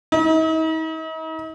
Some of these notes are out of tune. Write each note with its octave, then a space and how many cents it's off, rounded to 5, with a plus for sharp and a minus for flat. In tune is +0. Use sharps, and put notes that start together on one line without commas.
D#4 +45